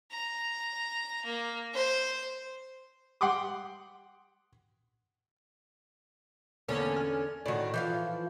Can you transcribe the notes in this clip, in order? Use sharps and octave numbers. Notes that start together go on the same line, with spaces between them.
A#5
A#3
C5
F#5 G5 C6 D6 D#6
E2 D3 A#3 B3 C#4 A4
G#5 F6
A2 D#3 F#4 C#5 D5
E3 F3 F5 G6